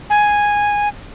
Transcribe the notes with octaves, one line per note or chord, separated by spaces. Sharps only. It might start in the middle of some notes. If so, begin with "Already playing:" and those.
G#5